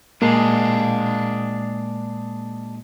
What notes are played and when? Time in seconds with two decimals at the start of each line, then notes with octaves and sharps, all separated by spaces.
0.22 A#2 G#3 A#3 D4 G#4